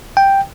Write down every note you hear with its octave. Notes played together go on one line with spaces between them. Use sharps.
G5